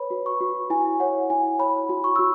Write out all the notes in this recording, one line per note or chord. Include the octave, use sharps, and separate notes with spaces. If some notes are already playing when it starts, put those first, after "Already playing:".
Already playing: B4 C#5 B5
F#4
C#6
F#4
E4 G#5
C#5 F#5
E4 G#5
C#5 B5
F#4
C#6
F#4 E6